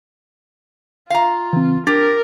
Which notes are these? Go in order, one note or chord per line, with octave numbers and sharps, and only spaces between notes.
F4 F5 A#5
C#3 E3 C4
D4 G4 A#4 A6